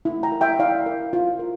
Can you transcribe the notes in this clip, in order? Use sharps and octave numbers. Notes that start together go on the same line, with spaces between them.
E4
G5 A#5
A#4
E5 G5
E4 D5 F5
A#4
F4
A#4